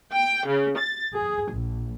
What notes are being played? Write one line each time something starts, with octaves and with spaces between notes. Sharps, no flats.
G5
C#3
A6
G#4
A#1